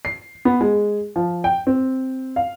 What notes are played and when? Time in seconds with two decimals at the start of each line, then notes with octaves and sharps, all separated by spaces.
0.05 C7
0.45 B3
0.61 G#3
1.16 F3
1.44 G5
1.67 C4
2.36 F5